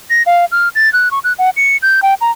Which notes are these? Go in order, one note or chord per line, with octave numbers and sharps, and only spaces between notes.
A#6
F5
F6
A6
F#6
C#6
F#6
F#5
C#7
G6
G5
A#5